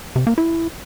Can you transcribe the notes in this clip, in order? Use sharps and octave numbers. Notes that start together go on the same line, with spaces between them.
C3
A#3
E4